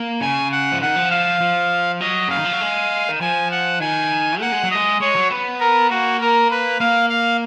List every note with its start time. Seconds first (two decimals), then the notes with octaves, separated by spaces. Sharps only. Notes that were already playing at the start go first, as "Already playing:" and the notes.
Already playing: A#3
0.21 C#3 G#5
0.52 F#5
0.72 F3
0.80 D#3 F#5
0.96 F3
1.11 F5
1.41 F3
2.00 F#3 D#5
2.28 C#3 F5
2.36 D#3
2.45 F3
2.53 F#3
2.61 G#3
3.09 D#3
3.21 F3 G#5
3.51 F#5
3.80 D#3 G#5
4.40 A#3 F#5
4.52 G#3
4.64 F#3
4.71 G#3 D#5
5.00 G#3 C#5
5.16 F#3
5.30 B3
5.60 A#4
5.90 A#3 F#4
6.21 A#4
6.50 B4
6.80 A#3 F5
7.10 F5